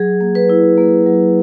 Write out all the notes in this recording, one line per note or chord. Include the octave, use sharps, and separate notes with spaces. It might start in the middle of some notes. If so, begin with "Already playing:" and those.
Already playing: F#3 G#4
A#3
B4
E4
A#3
F#3